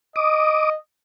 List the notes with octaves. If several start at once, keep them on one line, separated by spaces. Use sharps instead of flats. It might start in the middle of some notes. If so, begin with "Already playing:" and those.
D#5 D6 D#6